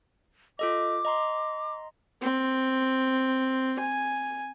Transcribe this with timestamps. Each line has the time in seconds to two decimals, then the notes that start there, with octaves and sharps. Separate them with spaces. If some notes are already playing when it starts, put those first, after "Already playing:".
0.59 F4 A4 D#5 D6
1.05 D#5 A#5 C6
2.22 C4
3.79 G#5